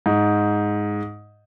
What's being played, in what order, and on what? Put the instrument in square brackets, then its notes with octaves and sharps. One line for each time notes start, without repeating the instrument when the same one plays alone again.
[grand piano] G#2